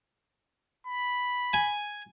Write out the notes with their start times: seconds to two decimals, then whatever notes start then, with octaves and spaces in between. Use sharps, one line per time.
0.87 B5
1.53 G#5